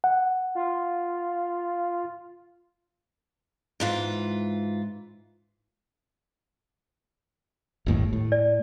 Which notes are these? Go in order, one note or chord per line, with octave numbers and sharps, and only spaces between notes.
F#5
F4
G#2 E3 F4
G1 D#2 A2
A2
D5